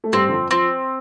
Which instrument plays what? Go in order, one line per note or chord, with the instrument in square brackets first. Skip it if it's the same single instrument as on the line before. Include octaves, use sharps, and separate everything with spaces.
[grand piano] A3
[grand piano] G2 G3 [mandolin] C4
[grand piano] D3
F2 F3
[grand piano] F3 [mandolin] C4